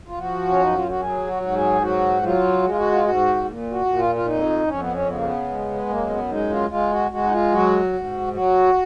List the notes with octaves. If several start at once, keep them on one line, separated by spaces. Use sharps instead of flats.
F4
F3 F#4
C#4
F#2 D#4
F4
F#4
F#3 G#4
F#4
G#2 F#4
G#4
F#3 F#4
F#3 F4
G#3 F#4
F4
F#4
F4
G#2 F#4
A#2
F#4
A#2
F4
F4
F2 D#4
F2 C#4
B3
C#4
C#3 B3
A#3
B3
G#3
F#2 A#3
B3
G#3 D#4
F4
G#3 F4
F#4
G#3 F#4
D#4
F4
F#3 F#4
G#2
F#3 F#4